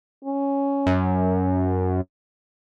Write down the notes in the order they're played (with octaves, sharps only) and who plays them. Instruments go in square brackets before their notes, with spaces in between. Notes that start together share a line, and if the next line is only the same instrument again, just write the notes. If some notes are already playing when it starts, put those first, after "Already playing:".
[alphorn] C#4
[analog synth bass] F#2